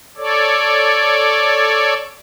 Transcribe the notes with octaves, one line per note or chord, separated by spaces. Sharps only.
A4 C#5 D5